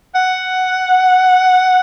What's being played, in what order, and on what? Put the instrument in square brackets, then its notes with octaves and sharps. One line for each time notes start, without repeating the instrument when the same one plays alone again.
[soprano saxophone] F#5